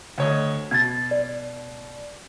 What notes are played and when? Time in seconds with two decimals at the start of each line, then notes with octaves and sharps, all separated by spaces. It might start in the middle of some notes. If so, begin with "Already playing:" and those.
0.18 D2 C#5 D#5
0.71 B2 G#6 A6
1.11 D5